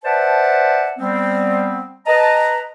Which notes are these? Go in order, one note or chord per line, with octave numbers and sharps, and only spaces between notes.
B4 C5 D5 E5 F#5 A5
G3 B3 C4
B4 D#5 A5 A#5